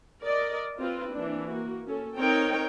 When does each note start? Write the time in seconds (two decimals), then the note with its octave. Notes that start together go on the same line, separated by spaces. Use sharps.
0.22 A#4 D5 D#5
0.78 C4 F4 B4
1.12 E3 A#3 D4
1.48 A#3 F#4
1.87 C#4 A4
2.18 C4 D#4 A#4 C#5 G5